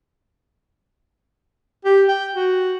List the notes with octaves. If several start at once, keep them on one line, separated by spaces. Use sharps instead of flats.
G4
G5
F#4